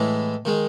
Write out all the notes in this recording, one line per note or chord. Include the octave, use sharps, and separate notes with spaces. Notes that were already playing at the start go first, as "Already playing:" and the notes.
Already playing: A2 E3 G#3
D#3 G#3